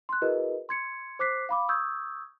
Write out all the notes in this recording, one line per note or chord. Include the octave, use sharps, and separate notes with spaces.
C6 F#6
E4 F#4 G#4 A#4 B4 D#5
C6 G#6 C#7
C5 D6 F#6 B6 C7
F5 B5 D6
C#6 D#6 E6 G6 G#6